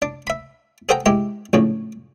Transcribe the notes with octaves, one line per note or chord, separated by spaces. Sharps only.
D4
E5 B5
G#4 A4 C5 F#5 G5 A#5
G#3 E4 G4
A#1 A2 C#3